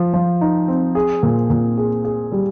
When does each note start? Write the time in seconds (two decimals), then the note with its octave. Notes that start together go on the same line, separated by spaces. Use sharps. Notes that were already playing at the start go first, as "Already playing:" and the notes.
Already playing: F3
0.14 F3
0.41 D#4
0.68 C4
0.95 G#4
1.23 A#2
1.50 A#2
1.77 G#4
2.05 G#4
2.32 G3